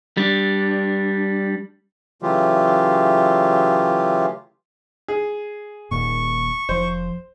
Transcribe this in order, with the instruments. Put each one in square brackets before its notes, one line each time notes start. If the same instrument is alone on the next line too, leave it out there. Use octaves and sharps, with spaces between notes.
[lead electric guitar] G3 D4
[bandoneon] C#3 E3 F#3 A3 F4 G4
[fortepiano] G#4
[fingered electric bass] D#1 D#2 A#2 [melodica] C#6
[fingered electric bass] F1 F3 [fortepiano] C5